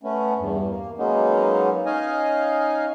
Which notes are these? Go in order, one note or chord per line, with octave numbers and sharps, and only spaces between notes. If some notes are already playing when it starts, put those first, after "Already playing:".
A3 B3 C#4
E2 G2
A#3
F#3 G#3 A#3 B3 C#4 D#4
C#4 D#4 D#5 F5 G#5